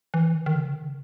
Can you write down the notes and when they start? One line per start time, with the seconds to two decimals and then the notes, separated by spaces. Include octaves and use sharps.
0.14 E3
0.35 D#3
0.46 D#3
0.56 C#3
0.76 D#3